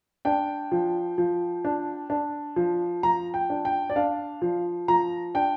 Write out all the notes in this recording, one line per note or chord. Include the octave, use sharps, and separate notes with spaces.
D4 G5
F3
F3
D4
D4
F3
F3 A#5
G5
D4
G5
D5
D4 F5
F3
F3 A#5
D4 G5